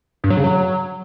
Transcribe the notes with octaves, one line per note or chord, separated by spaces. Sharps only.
G2
F#3
C#3
F#3